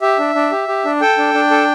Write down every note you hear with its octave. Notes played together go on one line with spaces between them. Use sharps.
G4 E5
D4
D4
G4
G4
D4
A4 G5
D4
D4
A4